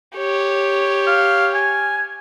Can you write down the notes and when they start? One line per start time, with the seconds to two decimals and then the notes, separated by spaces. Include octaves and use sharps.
0.16 G4 C#5
1.07 F5
1.54 G#5